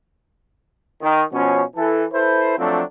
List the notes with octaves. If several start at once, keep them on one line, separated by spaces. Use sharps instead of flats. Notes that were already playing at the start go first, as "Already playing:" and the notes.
D#3
B2 F3 C#4
E3 A4
E4 A4 B4 C5
F3 F#3 A3 C4 D4